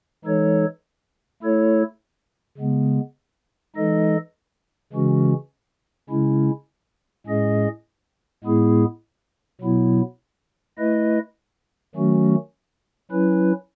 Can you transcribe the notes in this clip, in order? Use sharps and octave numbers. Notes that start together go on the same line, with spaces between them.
E3 G#3 D#4 A4 C#5
A3 E4 A4 C#5
C#3 G#3 B3
E3 G#3 D#4 A4 D#5
C#3 E3 G#3 C#4 F#4
C#3 G#3 C#4 E4
A2 G#3 C#4 G#4 D#5
A2 G#3 B3 E4 G#4
B2 F#3 B3 E4
A3 E4 B4 D#5
D#3 F#3 A3 C#4 F#4
F#3 C#4 E4 B4